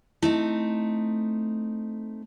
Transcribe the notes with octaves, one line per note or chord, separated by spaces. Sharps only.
A3 C4 D#4 E4